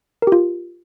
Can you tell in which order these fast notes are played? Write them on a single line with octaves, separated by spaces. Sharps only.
A#4 G4 F4